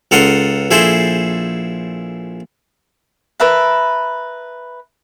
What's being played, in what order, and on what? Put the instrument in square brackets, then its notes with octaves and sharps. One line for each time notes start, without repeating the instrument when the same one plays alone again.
[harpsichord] C#2 A4 A#4 F#5 C6 D#6
A#1 E4 G#4 A4 C5 C6
[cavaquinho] A#4 B4 E5 A5